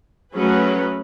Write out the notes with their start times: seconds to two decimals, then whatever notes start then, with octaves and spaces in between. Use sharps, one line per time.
0.32 F#3 A3 C#4 G#4 B4